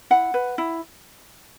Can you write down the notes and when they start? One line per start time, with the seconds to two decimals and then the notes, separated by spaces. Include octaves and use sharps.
0.10 E4 F#5
0.34 B4
0.58 E4